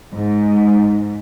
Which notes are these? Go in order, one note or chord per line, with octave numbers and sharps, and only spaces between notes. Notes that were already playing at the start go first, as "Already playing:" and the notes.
G#2